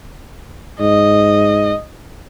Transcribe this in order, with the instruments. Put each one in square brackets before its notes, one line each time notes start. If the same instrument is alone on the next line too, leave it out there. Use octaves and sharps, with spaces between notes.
[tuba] G#2 [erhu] D#5